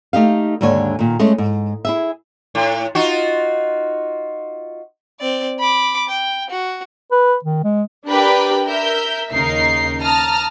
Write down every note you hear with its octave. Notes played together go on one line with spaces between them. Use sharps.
A3 D#4 G4 F5
D#2 G#2 D3 D4 C#5 G#5
A#2 D#3
G#3 A3 C#4
G#2
E4 G#4 E5
A2
D#4 F4 F#4
C4 D5
B5 D6
G5
F#4
B4
D#3
G#3
D4 G4 A#4 B4 G5 B5
A#4 E5 G6
D#2 C#3 D#4 A#4 C7
A5 A#5 D#6 F6 A6